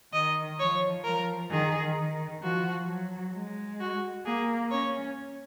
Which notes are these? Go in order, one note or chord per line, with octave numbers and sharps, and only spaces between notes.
D#3 D#5
F3 C#5
F3 A#4
D#3 G#4
D#3
F3 F#4
F#3
G#3
F#4
A#3 G#4
C#4 C#5